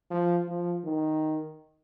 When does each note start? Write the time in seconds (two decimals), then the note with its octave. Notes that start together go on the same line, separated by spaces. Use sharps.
0.10 F3
0.48 F3
0.84 D#3